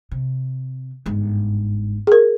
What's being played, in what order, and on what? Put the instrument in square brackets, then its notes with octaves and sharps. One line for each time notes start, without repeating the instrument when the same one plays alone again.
[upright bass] C3
G1 G#2
[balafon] G#4 A#4